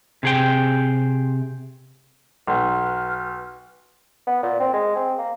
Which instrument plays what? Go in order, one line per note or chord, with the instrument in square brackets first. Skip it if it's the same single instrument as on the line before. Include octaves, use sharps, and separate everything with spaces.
[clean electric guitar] C3 G#4 G5
[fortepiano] B1 [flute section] B4 F6
[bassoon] B3
A#2
C4
G#3
C4
A#3